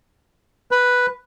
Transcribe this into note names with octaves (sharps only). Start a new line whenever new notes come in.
B4